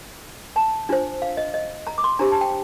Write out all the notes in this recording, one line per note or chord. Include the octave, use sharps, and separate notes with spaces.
A5
D4 F4 C5
F5
D#5
D#5
A#5
D6
C6
D4 G4 C5 A#5
A5
G5